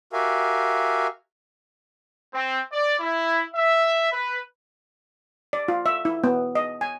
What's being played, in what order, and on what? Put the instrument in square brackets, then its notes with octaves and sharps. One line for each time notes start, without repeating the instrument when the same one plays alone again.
[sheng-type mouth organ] F#4 G4 A#4 E5 F5 G#5
[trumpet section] C4
D5
E4
E5
B4
[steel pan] D5
F4
E5
E4
B3
D#5
G#5